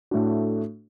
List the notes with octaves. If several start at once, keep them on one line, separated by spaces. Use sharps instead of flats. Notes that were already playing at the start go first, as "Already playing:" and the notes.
A2 A3 D4 F#4